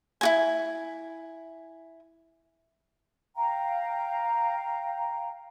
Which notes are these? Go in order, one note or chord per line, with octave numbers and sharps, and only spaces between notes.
E4 F#4 G#5
F5 G5 A#5